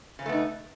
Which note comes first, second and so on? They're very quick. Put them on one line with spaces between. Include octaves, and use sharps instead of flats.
C#3 C#4 A3 B3 D#4